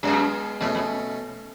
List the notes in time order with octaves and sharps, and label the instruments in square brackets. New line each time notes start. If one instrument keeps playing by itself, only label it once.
[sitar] F#2 [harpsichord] G#3 B3 F4
[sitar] F2 [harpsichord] B2 A3 C#4
[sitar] F2